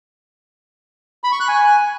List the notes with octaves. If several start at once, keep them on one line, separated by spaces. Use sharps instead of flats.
B5
C#6
F#6
G#5